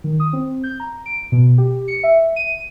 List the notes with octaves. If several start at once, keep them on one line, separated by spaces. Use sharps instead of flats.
D#3
D#6
C4
G6
A#5
D7
B2
G4
C#7
E5
D#7